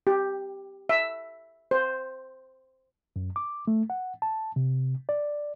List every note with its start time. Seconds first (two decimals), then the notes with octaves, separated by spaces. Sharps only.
0.07 G4
0.89 E5
1.71 C5
3.16 F#2
3.36 D6
3.68 A3
3.90 F#5
4.22 A5
4.56 C3
5.09 D5